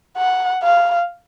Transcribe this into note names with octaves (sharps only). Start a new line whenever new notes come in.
F#5
F5